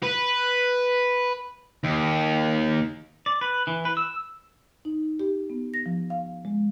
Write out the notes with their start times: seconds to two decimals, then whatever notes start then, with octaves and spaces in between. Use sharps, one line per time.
0.03 B4
1.84 D#2
3.26 D5
3.41 B4
3.67 E3
3.85 B4
3.97 E6
4.85 D#4
5.20 G4
5.50 B3
5.74 A#6
5.86 F3
6.10 F5
6.45 G#3